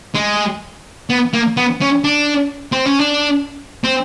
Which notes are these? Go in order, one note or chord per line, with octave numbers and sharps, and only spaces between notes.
G#3
B3
A#3
B3
C#4
D4
C4
C#4
D4
C4